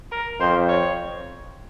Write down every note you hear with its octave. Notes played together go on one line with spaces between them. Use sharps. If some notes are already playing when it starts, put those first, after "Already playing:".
A#4
F2 C5
C#5